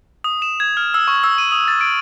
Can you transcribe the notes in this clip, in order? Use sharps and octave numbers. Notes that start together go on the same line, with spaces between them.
D#6
E7
G#6
F6
E6
C#6
E6
D#7
D#6
A6
D7